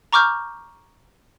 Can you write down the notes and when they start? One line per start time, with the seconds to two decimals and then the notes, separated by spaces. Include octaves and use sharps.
0.13 A#5 C#6 D6 F6 G6